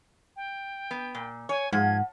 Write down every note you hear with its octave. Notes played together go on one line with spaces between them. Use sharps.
G5
B3
A#2
C#5 G#5
G#2 F3 F#5 G#6